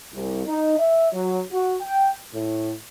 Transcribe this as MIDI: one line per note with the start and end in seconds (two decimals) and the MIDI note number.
0.14 0.44 36
0.46 0.76 63
0.78 1.10 76
1.12 1.40 54
1.52 1.74 66
1.81 2.13 79
2.34 2.71 45